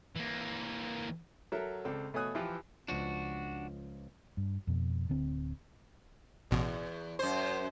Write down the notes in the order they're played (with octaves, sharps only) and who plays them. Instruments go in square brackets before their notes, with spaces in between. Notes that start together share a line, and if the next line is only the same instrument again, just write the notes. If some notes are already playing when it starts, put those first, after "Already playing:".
[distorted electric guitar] E3 A#3
[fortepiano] F#3 F#4 A4 A#4 E5
C#2 C4 A4 D5
B2 A3 C#5 G#5 D#6 F#6
E3 F3 E4 F4 G4 B4
[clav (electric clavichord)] C#2 F3 [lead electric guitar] D4 F#4
[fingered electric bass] G2
F2 B2
D1 D3 C4
[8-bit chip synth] A1 B2 [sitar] E2
[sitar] F#2 C5